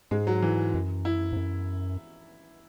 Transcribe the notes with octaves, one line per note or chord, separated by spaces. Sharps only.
G#2 G#3
F#3
E3
F#2
E4
G#2
F#2